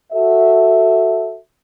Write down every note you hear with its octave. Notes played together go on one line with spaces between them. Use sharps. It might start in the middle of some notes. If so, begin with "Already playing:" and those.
F#4 A4 E5